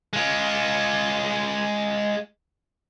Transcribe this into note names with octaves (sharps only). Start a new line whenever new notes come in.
G#3 F4